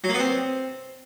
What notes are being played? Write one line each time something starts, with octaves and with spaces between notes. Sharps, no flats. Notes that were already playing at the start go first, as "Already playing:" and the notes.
F#3
A#3
B3
C4